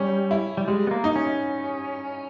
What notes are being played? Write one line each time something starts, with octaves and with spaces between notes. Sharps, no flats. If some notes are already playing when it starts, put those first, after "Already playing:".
Already playing: G3 C#4
E4
G3
G3 G#3
B3
A#3
D#4
C#4